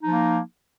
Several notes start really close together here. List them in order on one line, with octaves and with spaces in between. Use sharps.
D#4 F3 A#3